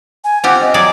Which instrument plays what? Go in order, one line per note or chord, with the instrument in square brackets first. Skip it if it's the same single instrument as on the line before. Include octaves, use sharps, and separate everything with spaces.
[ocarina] G#5
[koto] C4 F4 G4 [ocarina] F#5
[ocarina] D#5
[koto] F#3 G#4 D5